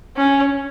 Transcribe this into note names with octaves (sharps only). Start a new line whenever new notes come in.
C#4